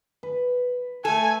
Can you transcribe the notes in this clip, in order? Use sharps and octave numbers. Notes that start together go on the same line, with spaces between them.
B4
A3 A4 G#5